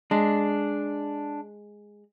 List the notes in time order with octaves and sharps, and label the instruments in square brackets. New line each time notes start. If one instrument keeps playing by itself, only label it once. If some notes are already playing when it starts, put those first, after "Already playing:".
[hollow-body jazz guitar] G#3 [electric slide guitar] D4